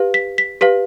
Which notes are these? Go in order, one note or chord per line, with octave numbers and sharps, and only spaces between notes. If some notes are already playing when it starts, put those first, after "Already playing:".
Already playing: G4 B4 F5
B6
B6
G4 B4 F5 B6